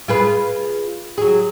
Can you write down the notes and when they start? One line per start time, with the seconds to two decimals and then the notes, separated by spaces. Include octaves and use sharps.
0.08 F4 G#4 B4
1.18 F#3 G#4